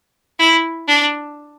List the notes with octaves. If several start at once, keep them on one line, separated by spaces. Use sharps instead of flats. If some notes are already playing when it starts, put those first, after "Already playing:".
E4
D4